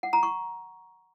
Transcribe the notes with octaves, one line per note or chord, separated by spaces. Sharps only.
F#5
A#5
C#6